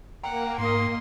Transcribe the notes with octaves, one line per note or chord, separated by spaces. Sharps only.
A#3 F#5 G5 A#5
G#2 D#5 C6